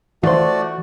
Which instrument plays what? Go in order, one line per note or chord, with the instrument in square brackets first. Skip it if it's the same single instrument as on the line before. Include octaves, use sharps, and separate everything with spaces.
[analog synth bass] E3 [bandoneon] A3 D5 [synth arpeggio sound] F4 C5 [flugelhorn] F#4